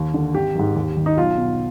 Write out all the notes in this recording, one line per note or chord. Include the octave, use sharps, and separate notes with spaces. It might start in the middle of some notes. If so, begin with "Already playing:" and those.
Already playing: D#2
D3
G#1 G4
G#2 D#3
D#2
D#3
D#4
B1 F4
B2